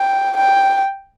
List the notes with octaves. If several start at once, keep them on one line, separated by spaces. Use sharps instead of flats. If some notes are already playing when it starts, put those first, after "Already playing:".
Already playing: G5
G5